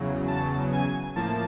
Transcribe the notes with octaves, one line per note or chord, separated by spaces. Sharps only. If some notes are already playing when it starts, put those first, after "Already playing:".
Already playing: E2 C#3 F#3
A5
G#5
A2 F3 A#3 A5